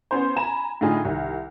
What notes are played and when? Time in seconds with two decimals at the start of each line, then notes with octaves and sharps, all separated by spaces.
0.11 B3 C#4 C5
0.36 G#5 A#5 B5 E7
0.81 A2 D3 D#4 F4 G#4
1.05 C2 D#3